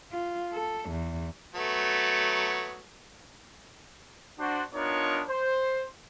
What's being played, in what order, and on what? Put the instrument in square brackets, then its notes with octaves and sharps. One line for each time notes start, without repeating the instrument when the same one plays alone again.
[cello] F4
A4
E2
[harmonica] F#3 A3 B3
[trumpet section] D4 F#4 C5
B3 D4 D#4 F4 A#4 C#5
C5